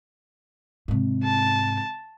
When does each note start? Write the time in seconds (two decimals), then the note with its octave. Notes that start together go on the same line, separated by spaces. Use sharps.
0.88 G#2 C3
1.24 A5